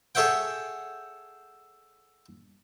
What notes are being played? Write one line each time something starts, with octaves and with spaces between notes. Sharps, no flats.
G#4 A4 C#5 E5 F#5 G5